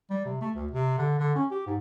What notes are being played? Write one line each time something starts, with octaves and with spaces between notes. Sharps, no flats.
G3
C3
A3
D2
C3
D3
D3
C#4
G4
G#2